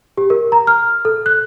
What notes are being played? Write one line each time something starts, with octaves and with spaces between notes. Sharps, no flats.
G4
A#4
A#5
F6
A4
F#6